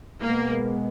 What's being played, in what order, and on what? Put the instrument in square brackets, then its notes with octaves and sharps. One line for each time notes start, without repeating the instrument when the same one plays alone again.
[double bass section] B2 G#3 B3 [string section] A#3